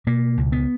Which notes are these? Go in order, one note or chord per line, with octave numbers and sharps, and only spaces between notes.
B2 A#3
C#2
B3